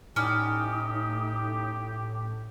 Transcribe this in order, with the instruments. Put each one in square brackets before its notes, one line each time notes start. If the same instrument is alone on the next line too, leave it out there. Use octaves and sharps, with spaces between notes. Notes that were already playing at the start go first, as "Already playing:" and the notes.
[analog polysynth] A2 [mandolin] C#4 D5 [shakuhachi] D#4 [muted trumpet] G4